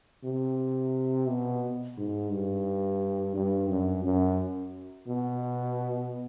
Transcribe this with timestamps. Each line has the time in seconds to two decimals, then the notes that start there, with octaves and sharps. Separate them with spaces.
0.25 C3
1.28 B2
1.97 G#2
2.32 G2
3.35 G2
3.69 F#2
4.04 F#2
5.08 B2